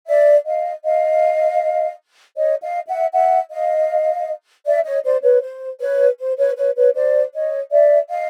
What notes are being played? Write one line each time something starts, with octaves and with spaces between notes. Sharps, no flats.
D5 E5
D#5 F5
D#5 F5
C#5 D#5
D#5 F5
E5 F#5
E5 F#5
D#5 F5
D5 E5
C#5 D#5
C5 D5
B4 C#5
C5
B4 C#5
C5
B4 C#5
B4 C#5
B4 C#5
C5 D5
C#5 D#5
D5 E5
D#5 F5